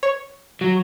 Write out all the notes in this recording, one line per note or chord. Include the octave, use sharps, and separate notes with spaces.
C#5
F#3